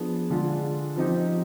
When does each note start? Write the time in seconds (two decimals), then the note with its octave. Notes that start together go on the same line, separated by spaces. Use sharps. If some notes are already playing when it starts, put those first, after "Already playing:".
Already playing: F3 B3 D4 G#4
0.30 D3 G#3 D4 F4
0.96 F3 C4 D#4 G4